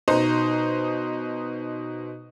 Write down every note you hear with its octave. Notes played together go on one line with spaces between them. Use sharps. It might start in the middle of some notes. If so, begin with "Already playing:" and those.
B2 D#4 C5